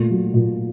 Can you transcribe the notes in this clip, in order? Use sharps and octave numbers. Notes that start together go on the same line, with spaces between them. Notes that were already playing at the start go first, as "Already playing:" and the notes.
Already playing: A#2 A3
F#3
A#2